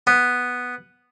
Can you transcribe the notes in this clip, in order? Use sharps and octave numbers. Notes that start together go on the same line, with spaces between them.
B3